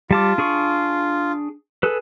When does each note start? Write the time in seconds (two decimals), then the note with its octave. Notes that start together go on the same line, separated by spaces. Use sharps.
0.11 G3 F4 A5 D6
0.38 D4 G#4 C#6
1.83 G#4 A4 B4